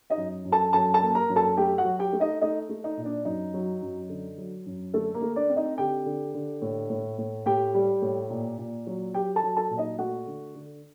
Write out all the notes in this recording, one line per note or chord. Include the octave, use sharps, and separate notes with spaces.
D#4 D#5
F#2
F#2
A4 A5
F#2 A4 A5
A4 A5
A#3
A#4 A#5
F#2
A4 A5
A3 G4 G5
F#4 F#5
F#3
G4 G5
A3
D#4 D#5
A3 D#4 D#5
A3
D#4
A#2
D4
F#2 D#4
F#3
F#2
D3
F#3
F#2
D3 A3 A4
A#3 A#4
A3
D4 D5
C4
D#4 D#5
D3 G4 G5
D3
D3
A2
A2
A2
A2 G4 G5
G3
A2
A#2
A#2
F#3
F#3 G4 G5
A4 A5
F#3
A4 A5
A#2
D#4 D#5
A3 F#4 F#5
D3
D3